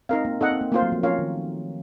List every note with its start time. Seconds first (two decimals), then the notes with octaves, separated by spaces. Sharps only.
0.09 C4 D#4 A#4 F5
0.25 A#3
0.41 C4 D#4 A4 D#5 F#5
0.51 C4
0.61 A#3
0.72 A3 A#3 F4 C5
0.82 F#3
0.92 F3
1.03 F3 C#4 F4 A#4 C#5 F5
1.19 D#3